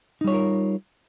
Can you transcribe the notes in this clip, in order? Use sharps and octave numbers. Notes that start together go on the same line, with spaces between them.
G3 D#4 F4 A#4 C#5